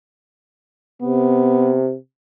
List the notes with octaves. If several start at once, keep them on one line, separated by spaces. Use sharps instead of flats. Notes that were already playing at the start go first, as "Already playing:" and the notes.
C3 B3